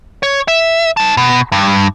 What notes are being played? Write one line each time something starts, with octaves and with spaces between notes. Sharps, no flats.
C#5
E5
D#4 A5
B2
G2